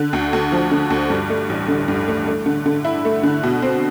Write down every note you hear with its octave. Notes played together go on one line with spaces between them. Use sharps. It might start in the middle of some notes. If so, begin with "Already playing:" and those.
Already playing: D3
D2
D2
F3
D3
D2
G2
A3
A1
D3
G2
A3
A3
D3
D3
E4
A3
D3
B2
C4